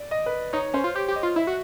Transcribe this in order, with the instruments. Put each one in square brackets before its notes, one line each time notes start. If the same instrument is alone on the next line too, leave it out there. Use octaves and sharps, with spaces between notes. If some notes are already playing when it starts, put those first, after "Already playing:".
Already playing: [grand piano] D5
D#5
B4
[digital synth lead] D#4 [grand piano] C#5
[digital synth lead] C#4 [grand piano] C5
[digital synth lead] F4
[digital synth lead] G4 [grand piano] C#5
[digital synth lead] G4
[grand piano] D#5
[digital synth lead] F4
[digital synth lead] E4 [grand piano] E5
[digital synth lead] F#4